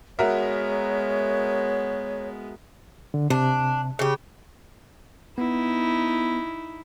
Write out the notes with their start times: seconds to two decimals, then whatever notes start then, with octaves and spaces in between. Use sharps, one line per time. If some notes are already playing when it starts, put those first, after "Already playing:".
0.19 G#3 B3 F#4 A#4 C#5 E5
3.14 D3
3.30 C3 D4
3.99 C#3 G4
5.38 B3 D#4 E4